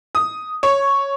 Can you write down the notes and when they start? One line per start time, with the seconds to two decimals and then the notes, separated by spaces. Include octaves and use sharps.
0.15 D#6
0.63 C#5